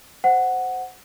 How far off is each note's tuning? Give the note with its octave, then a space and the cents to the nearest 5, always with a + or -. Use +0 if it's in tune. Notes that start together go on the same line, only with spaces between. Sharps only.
C5 -10 F#5 +0